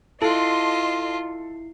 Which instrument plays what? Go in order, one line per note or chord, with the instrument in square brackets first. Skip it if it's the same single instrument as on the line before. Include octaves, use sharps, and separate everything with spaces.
[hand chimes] E4 C7 [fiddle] F4 [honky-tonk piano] A4 [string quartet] D#5 C6